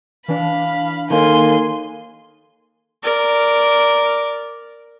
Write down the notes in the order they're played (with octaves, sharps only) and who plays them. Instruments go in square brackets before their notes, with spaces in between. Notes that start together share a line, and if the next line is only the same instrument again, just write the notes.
[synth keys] E3 D4 [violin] F5 B5
[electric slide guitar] D#3 A#3 [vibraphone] A4 F5 [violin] G#5 C6
[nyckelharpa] A#4 D5